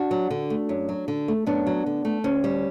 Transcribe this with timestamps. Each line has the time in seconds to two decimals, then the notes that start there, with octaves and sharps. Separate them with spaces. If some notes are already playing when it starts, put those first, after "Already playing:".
Already playing: D4 F#4
0.11 F#3
0.31 D3
0.50 A3
0.69 F#2
0.89 F#3
1.08 D3
1.28 A3
1.46 F#2 B3 D4
1.67 F#3
1.86 D3
2.05 A3
2.24 D2 C#4
2.44 G3